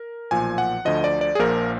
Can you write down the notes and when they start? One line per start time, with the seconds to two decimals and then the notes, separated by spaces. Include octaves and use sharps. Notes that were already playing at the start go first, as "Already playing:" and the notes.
Already playing: A#4
0.31 B1 A#2 F3 G#5
0.58 F#5
0.85 D2 D3 F3 D#5
1.04 D5
1.21 D5
1.35 G#4
1.39 A#1 A#2 F3 A#4